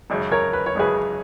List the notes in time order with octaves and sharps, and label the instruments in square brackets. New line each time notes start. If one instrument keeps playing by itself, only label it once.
[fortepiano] G#1 F#2 C#3
[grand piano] A#4 C#5
B4
C#5
[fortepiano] G#1 F#2 C#3 [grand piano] G#4 B4